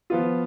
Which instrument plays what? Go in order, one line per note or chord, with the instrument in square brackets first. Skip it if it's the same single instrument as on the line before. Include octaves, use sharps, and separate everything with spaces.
[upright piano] F3 B3 F4